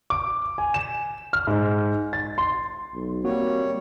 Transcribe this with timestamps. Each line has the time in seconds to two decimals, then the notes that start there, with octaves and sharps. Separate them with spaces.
0.10 D6
0.58 G#5
0.74 E7
1.33 F6
1.47 G#2
2.13 A6
2.38 C6
2.94 B1
3.24 G3 A#3 C4 F#4 C#5